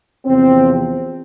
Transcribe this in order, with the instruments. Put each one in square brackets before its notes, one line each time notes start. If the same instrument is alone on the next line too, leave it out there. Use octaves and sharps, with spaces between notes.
[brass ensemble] E2 C3 F3 C4